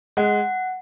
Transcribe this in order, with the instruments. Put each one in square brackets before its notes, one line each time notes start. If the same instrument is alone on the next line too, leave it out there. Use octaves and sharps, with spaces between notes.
[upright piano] G#3 [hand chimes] F#5